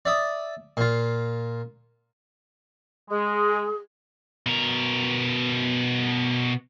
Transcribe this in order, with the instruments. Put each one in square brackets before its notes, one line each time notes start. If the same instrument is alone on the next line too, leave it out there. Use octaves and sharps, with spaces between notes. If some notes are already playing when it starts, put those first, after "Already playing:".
[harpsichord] D5 E5 D#6
A#2 F4
[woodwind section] G#3 [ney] G#4
[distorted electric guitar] B2 A#4